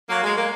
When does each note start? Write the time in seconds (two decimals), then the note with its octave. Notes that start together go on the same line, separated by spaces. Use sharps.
0.08 F#3 A#3
0.23 G#3
0.36 A#3